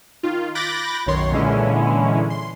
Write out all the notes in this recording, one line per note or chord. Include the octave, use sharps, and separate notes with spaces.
D#3 F4
B5 D6 F#6 G6 A6 A#6
B1 F#2 D#3 C#5 C6
A#2 D3 E3 G#3 C#4 E4
C6